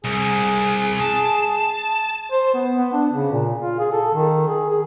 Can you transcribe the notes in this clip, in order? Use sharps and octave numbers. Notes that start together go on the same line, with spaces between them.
C2 G#4
A5
C5
B3
B3
D4
C#3
A#2
F4
G#4
A4
D#3
G#4
G#4